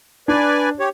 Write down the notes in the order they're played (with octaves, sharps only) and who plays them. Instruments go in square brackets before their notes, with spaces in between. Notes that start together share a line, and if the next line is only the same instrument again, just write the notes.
[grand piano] D4 [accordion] B4 D5 G#5
[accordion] G4 C#5